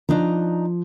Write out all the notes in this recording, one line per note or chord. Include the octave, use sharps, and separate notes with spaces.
F3 D4 D#4 A#5